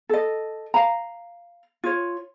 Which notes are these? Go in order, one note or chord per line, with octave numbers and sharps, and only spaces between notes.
A4 D#5
F5 A#5
F4 C#5